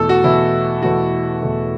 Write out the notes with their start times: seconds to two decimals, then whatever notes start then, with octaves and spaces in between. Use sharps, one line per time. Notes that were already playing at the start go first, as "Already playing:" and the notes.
Already playing: E2 B2 A3 A4
0.09 F#4
0.24 E2 B2 A3 E4
0.83 E2 B2 A3 F#4
1.42 E2 B2 A3